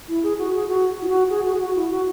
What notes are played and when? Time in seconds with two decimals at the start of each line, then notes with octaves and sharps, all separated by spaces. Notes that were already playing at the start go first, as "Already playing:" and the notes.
0.08 E4
0.23 G#4
0.39 F#4
0.55 G#4
0.69 F#4
1.02 E4
1.07 F#4
1.30 G#4
1.45 F#4
1.54 G#4
1.60 F#4
1.75 E4
1.90 F#4